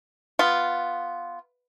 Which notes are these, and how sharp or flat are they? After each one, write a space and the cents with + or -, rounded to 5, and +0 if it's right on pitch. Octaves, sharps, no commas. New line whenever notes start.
B3 +0 F4 -5